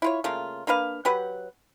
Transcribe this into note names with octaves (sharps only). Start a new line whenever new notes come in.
E4 F4 C#5
C#3 A3 A#3 F4
A#3 D4 B4 F5
F#3 G4 B4 F#5